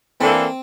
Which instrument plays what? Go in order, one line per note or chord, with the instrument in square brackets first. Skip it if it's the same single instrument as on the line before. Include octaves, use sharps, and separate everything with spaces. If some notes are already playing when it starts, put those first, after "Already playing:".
[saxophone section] E3 A#3 D4 A4 [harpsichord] C4